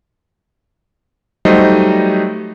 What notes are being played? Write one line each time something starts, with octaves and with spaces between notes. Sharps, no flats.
F#3 G3 A3 D#4 C5 D#5